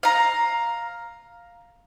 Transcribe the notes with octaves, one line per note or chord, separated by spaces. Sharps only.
F5 A#5